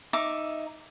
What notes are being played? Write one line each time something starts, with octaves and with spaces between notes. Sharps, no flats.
D#4 E5 D6